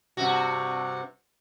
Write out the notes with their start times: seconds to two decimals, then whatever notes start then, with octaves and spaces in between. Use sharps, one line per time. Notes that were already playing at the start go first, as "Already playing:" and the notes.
0.17 G2 C3 F#4